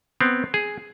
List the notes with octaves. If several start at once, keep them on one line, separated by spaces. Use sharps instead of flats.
B3 C4
G#4